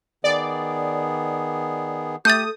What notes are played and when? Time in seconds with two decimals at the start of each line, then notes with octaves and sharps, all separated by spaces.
0.24 D#3 B3 G#4 D5
2.25 A3 G4 D#6 G6 A6